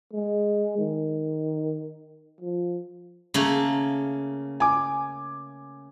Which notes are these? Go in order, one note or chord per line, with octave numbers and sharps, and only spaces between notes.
G#3
D#3
F3
C#3 A3 A#3
G#5 D6